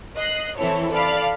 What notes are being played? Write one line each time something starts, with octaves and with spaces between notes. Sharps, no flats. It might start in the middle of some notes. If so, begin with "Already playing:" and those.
D#5 F#6 C7
E3 C4 E4 A4 C#5
A4 D5 F5 B5